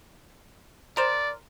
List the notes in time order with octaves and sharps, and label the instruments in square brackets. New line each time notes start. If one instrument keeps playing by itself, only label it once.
[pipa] A#4 C5 [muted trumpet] D5